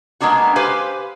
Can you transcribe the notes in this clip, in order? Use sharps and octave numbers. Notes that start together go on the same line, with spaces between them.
G#3 A#3 B3 D4 F#4
G4 B4 C5 F5 G#5